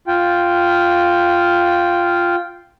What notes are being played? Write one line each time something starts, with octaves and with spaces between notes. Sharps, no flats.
F4 G5